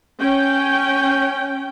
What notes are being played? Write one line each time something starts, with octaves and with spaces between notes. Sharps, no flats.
C#4 G5